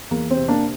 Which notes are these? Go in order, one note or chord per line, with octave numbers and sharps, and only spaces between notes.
E2 A#3
C4
C3
A#3 D4